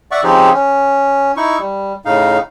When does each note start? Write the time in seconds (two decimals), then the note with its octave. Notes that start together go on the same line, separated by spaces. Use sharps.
0.11 D5 E5 F#5 C#6
0.23 C#3 F3 C4 D#4 G4 G#4
0.53 C#4
1.37 D#4 E4 C#6
1.59 G3
2.05 A2 C#3 D#4 F5